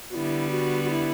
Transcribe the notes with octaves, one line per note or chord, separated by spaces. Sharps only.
D3 G3 B3 E4 F#4
F#4
F#4
E4